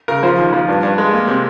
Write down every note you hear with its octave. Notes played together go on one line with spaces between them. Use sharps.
C#3 A#4
F3 C5
D#2
F3
G2
G2
G#3
A#3
C3